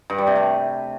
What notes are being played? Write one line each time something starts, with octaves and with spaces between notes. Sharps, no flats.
G2
G3
C3
A3